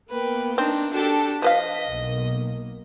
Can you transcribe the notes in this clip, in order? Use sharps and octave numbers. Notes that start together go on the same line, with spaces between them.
A#3 B3 B4 G5
C4 D4 D#4
D4 F#4 G4 A4 A5
F3 B4 D#5 F5 B6
B1 A#3